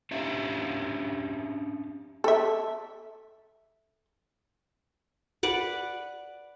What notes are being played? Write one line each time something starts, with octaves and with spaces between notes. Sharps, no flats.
C#4 D4 G4 E5 F5
A4 E5
B4 D5 F#5